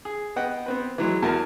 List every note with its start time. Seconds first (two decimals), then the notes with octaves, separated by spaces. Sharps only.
0.05 G#4
0.36 B3 D#5 F#5 G5
0.66 B3 C4 B4
0.98 E3 F#3 G#3
1.22 E2 F#4 A#4 A5 A#5